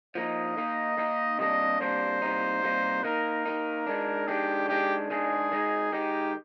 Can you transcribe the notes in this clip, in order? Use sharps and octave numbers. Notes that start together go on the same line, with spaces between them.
F3 A#3 D#4 D#5
D#3 A#3 D#4
D#3 A#3 D#4
C3 G3 A#3 D4 D#5
C3 G3 A#3 D4 C5
C3 G3 A#3 D#4
C3 G3 A#3 D#4
D#3 A#3 D#4 A#4
D#3 A#3 D#4
D#3 G#3 D4
D#3 G#3 D4 G4
D#3 G#3 D4 G4
D#3 G#3 D4 G#4
D#3 G#3 D#4
D#3 G#3 D#4 G4